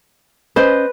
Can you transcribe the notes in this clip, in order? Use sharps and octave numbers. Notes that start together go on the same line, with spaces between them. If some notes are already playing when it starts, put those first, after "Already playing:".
C#4 B4 C5 D#5